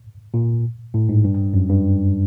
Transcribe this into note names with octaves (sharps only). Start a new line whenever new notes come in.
A#2
A2
G#2
G2
F#2
G2